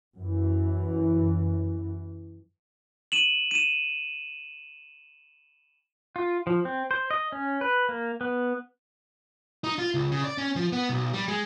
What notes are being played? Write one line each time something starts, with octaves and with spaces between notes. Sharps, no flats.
F#2 E3
D#7 E7 F#7
D#7 E7
F4
F3
C4
C5
D#5
C#4
B4
A#3
B3
D#4
F4
C#2
C#3
D5
C#4
F3
B3
B1
G3
G#3